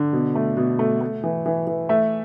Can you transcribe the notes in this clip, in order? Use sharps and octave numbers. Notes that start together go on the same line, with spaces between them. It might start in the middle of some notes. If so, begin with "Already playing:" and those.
Already playing: D3
B2
A3
B2
A3
A3
E3
E3
E3
A3 E5